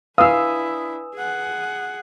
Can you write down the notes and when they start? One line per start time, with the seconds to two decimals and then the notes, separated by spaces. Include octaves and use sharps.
0.18 D4 E4 B4 F5 G#5 D#6 E6
1.15 G#4 F#5